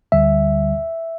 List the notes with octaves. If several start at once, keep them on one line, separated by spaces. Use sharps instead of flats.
D2 D3 G3 E5